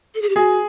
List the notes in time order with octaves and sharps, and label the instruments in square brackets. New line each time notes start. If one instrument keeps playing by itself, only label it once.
[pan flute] A4
G#4
G4
[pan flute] F#4 [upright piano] G#4